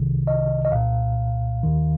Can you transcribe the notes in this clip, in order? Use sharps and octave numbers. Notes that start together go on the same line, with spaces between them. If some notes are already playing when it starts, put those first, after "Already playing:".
Already playing: C2 C3 D#3
D#5
D#5
C2 A#2 F5
D#2 D#3